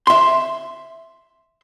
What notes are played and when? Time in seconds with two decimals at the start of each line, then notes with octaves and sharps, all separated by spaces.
0.07 E5 C6